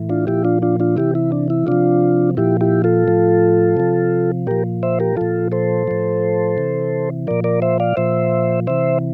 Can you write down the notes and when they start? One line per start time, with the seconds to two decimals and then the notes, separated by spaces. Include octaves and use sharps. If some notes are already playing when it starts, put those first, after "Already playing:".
Already playing: A2 E3
0.09 D4 F4
0.27 A#2 F3 E4 G4
0.45 D4 F4
0.62 D4 F4
0.80 D4 F4
0.97 C3 E3 E4 G4
1.15 E4
1.32 D4
1.50 E4
1.67 C3 F3 D4 F4
2.37 A#2 F3 E4 G4
2.61 E4 G4
2.84 F4 A4
3.08 A2 F3
3.77 C3 F3
4.47 A#2 F3 G4 A#4
4.83 C5 E5
5.00 G4 A#4
5.17 A#2 F3 F4 A4
5.52 A4 C5
5.87 A2 F3
6.57 C3 E3
7.27 A#2 F3 A#4 D5
7.44 A#4 D5
7.62 C5 E5
7.80 D5 F5
7.97 A#2 F3 C5 E5
8.67 C3 E3 C5 E5